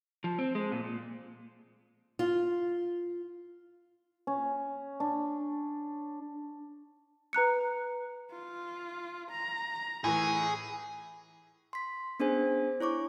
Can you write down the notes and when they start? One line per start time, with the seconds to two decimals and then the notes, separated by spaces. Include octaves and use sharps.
0.24 F3
0.39 C4
0.55 G#3
0.72 A#2
0.84 A#2
2.19 F4
4.27 C#4
5.00 D4
7.33 B4 A#5 F#6 C#7
8.31 F4
9.31 A#5
10.04 A2 E3 G#4
11.73 C6 B6
12.20 B3 C#4 D4 G#4 C5 G#5
12.80 E4 C#5 C#6 D6